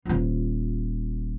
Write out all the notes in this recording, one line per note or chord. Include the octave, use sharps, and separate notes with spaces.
D#1 F4